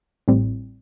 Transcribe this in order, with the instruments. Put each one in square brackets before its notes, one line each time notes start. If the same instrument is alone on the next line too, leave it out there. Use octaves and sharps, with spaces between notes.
[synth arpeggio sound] A1 A2 G3 C4